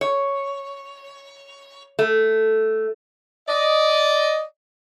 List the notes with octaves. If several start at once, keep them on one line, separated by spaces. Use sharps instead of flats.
C#5
A3
D5 D#5